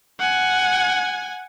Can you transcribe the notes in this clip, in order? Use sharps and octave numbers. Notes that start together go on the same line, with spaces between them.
F#5 G#5